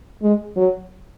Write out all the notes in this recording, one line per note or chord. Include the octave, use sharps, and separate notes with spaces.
G#3
F#3